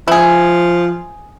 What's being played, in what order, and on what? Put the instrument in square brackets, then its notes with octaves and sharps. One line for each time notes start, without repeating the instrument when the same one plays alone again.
[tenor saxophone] F3 [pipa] E4 G#4